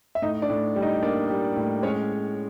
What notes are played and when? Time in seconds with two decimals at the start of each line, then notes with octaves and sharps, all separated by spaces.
0.15 E5
0.22 A2 D#4 D#5
0.42 D4 D5
0.50 A2
0.76 G3
0.82 D#4 D#5
1.03 A#3 D4 D5
1.29 G3
1.56 A2
1.83 G#3 C#4 C#5